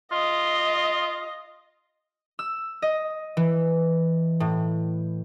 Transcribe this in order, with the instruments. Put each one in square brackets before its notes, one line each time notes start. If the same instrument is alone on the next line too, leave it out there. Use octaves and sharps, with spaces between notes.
[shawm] F4 [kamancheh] D#5
[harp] E6
D#5
E3
A2